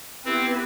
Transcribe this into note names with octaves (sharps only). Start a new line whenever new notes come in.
B3 C4 E4 G4 B4